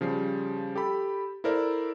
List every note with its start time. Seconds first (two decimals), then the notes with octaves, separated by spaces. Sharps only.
0.01 C#3 F3 G3 C7
0.76 G4 A4 B5
1.44 E4 A4 A#4 C5 D5 E5